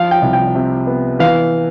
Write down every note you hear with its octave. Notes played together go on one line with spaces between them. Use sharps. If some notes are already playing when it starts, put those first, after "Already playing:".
Already playing: F3 F5
G5
C2
G5
C3
B3
E3 F5